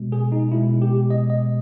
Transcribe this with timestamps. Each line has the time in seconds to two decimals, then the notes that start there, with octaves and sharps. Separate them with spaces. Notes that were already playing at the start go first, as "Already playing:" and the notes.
Already playing: B2 G#3
0.12 G#4
0.32 D#4
0.52 B2 G#3 E4
0.82 G4
1.10 D#5
1.30 D#5